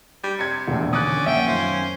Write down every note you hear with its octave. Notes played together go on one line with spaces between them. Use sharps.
G3
C3 G#6 C#7
E1 A#1 D#2
E2 D3 D#3 C#4 D5 D#6 F#6
A#1 A#3 E5 F#5 G5
F#2 D#3 F4 C5